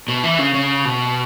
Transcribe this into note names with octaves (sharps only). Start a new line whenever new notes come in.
B2
E3
C#3
C#3
B2